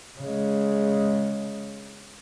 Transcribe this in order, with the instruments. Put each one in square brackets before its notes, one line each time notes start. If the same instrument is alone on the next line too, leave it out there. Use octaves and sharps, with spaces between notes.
[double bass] C#3 G#3